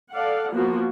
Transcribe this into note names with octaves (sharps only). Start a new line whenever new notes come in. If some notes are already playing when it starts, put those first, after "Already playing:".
A4 D5 F5 F#5
F3 A#3 B3 F4 F#4